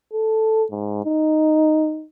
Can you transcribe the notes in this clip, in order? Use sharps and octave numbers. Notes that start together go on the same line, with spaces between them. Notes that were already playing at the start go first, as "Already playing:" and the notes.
A4
G#2
D#4